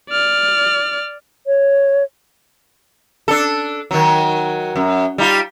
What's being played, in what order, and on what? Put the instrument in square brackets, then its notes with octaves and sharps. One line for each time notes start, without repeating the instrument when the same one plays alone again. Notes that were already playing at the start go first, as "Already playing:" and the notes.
[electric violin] D5 F6
[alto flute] C#5
[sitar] D4 A4
D#3 F#3
F#2
G3 D#4 F4